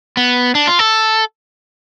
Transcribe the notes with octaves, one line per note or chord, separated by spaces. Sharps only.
B3
D4
F4
A4